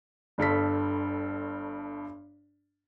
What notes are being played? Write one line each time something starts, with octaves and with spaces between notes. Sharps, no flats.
G1 G2 A4 B6